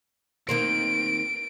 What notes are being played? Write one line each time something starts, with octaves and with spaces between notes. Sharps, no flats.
D#3 A#3 C4 D7